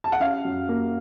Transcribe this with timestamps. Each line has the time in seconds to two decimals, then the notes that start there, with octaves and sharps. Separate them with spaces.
0.04 A5
0.12 F#5
0.20 C#4 F5
0.45 F#2
0.69 A#3